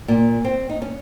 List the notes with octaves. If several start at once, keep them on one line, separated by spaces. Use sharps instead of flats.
A#2
C4
D#4
C#4